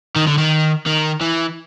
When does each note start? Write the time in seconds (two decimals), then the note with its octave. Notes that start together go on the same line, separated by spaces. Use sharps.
0.16 D#3
0.26 D3
0.37 D#3
0.86 D#3
1.21 E3